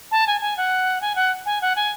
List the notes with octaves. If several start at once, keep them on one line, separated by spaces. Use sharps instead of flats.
A5
G#5
G#5
F#5
G#5
F#5
G#5
F#5
G#5